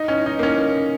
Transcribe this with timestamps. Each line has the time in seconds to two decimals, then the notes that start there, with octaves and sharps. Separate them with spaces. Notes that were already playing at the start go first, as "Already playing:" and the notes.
Already playing: D#4
0.08 C#4
0.26 D#4
0.39 A#3
0.43 C#4